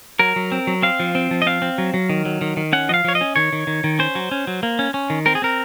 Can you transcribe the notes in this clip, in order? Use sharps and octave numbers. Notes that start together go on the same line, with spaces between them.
F#3 A#4
F#3
C4
F#3
C4 F5
F3
C4
F3
D#5
C4 F5
C4
F#3
F#3
D#3
F#3
D#3
D#3
C#4 F#5
F3 D#5 F5
F3 C#5
D#5
C#4
D#3 C#5
D#3
D#3
D#3
C#4 C5
F#3
C#4
F#3
A#3
C#4
C#4
D#3
C4 A#4
G#4
C4 A#4